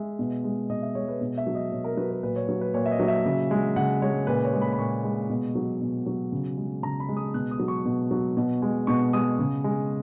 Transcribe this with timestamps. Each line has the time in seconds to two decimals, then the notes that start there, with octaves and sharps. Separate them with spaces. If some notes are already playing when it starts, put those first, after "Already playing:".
Already playing: G#3 E5
0.19 B2
0.44 G#3
0.69 B2 D#5
0.82 E5
0.95 G#3 C#5
1.08 B4
1.21 B2
1.38 E5
1.47 F#3
1.55 D#5
1.72 B2 C#5
1.84 A#4
1.97 F#3 B4
2.10 B4
2.23 A#2 B4
2.36 C#5
2.49 F#3
2.61 B4
2.74 A#2 C#5
2.86 E5
2.91 D#5
3.00 F#3
3.08 E5
3.26 C#3
3.51 G#3
3.76 C#3 F#5
4.02 G#3 C#5
4.27 A#2 B4
4.45 C#5
4.53 G#3
4.62 B5
4.73 B5
4.79 A#2 C#6
5.04 G#3
5.30 B2
5.55 F#3
5.81 B2
6.06 F#3
6.32 C#3
6.57 G#3
6.83 C#3 A#5
7.00 B5
7.09 G#3
7.17 D#6
7.34 B2 F#6
7.51 D#6
7.59 F#3
7.68 C#6
7.85 B2
8.11 F#3
8.37 B2
8.62 G#3
8.87 B2 C#6
9.13 G#3 D#6
9.39 C#3
9.64 G#3